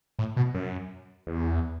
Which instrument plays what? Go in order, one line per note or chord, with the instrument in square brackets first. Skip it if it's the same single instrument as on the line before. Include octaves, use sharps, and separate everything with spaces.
[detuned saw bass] A2
B2
F#2
E2